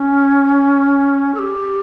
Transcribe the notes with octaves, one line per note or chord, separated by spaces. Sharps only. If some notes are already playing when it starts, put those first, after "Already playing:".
Already playing: C#4
A4
G4